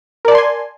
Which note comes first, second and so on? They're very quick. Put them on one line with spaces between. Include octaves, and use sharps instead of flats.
A#4 D5 A5 C6 G#5